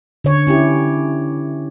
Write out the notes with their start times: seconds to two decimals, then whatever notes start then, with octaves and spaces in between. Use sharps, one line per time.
0.24 D3 C#5
0.47 C#4 E4 G4